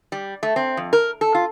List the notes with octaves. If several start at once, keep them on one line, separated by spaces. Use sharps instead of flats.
G3
A3
C4
F2
A#4
A4
F4